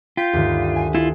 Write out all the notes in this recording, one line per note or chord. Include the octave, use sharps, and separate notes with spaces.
F4 G5 G6 B6
D2 G2 D#3
G#5
E4 F4